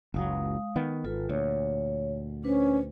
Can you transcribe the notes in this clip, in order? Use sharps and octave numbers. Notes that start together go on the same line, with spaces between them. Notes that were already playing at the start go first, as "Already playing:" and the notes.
F#1 C#2 F#3 G#3 F5 D#6
D#3 B3
G#1 F4 A4 B4
D2 A#2 C#5
C#4 D4 B4 C5